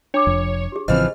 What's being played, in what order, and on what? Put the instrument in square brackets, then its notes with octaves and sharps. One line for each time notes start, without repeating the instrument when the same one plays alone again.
[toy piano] D4 A#5 D6 [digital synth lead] C#5
[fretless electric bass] F1 F2
[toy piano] G4 G#4
[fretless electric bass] A1 C#3 C4 [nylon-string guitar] E3 F3 [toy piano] D#5 [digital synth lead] F6